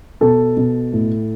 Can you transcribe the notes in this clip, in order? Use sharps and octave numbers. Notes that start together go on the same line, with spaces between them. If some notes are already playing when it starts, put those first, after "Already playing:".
B2 A4
B2
A2